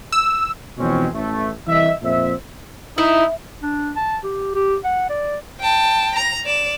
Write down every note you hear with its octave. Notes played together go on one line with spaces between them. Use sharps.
E6
F2 B2 E3 G#3 C4 C#4
A1 A3
C2 E3 D#5 E5
F2 A#2 C5 E5
D#4 E4
D4
A5
G4
G4
F#5
D5
G5 A5
A#5
D5 E7